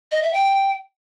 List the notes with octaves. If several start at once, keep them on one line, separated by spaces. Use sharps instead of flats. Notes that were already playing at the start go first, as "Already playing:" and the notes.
D#5
E5
G5